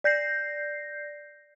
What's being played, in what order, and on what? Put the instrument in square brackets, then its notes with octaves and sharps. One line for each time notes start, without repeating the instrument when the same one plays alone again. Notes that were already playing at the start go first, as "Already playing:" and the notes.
[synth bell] D5 G6 A#6 C7